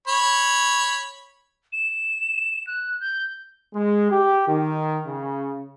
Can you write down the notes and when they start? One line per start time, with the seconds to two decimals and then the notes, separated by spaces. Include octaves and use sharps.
0.08 C#5 B5
1.72 E7
2.67 F#6
3.00 G6
3.73 G#3
4.11 G4
4.48 D#3
5.07 C#3